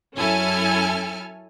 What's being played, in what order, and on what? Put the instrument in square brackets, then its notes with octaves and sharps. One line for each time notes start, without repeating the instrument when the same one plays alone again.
[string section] F#2 C#4 E4 A4 G#5 F6